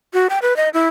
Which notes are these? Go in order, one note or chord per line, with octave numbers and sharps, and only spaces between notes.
F#4
G5
B4
D#5
E4